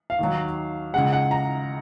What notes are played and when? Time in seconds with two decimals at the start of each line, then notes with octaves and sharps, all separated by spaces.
0.10 F5
0.19 D#2 D#3 F#3
0.94 C#2 C#3 G#3 F#5
1.13 F#5
1.31 A#5